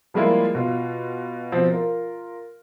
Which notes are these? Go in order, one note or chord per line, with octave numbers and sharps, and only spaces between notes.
F3 G3 G#3 A#3 E4 F4
B2 F4
B2 F3 C4
F4 A#4